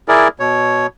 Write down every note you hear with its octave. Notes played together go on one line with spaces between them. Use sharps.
E4 G#4 A#4 D5
B2 C#5